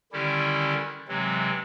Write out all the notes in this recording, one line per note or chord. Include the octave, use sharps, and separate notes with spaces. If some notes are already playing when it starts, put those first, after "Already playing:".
D3 D#3 G3 C#4 E4 G4
C3 E3 F#3 G#3 C4